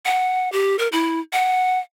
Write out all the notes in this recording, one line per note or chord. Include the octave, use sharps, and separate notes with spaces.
F#5
G4
A#4
E4
F#5